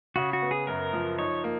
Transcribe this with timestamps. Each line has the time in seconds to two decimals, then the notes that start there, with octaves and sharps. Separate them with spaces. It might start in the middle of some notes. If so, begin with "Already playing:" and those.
0.16 C#3 F#4
0.33 F#4
0.42 B3
0.51 G#4
0.67 F#2 A#4
0.93 F3
1.18 D#4 C#5
1.44 A#3